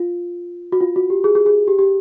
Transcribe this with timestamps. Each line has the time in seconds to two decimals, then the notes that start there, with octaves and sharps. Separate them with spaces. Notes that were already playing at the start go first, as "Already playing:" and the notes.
Already playing: F4
0.72 F#4
0.81 F4
0.96 F#4
1.10 G4
1.24 G#4
1.35 G#4
1.46 G#4
1.68 G4
1.79 G4